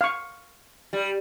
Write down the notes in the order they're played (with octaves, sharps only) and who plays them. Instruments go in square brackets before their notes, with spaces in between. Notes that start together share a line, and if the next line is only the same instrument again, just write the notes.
[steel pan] F5 C#6
[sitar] G3